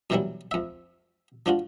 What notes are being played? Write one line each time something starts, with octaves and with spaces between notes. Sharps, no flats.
F#2 B2 E3 F#3 G3 E4
F2 E5
F3 D4 F4 F#4